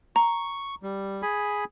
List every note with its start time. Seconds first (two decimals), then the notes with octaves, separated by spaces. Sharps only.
0.16 A#5 C#6
0.83 G3
1.22 G#4 G#5 B5